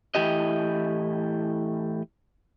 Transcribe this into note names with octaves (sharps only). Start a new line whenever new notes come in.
A2 E3 E4 G4 D#5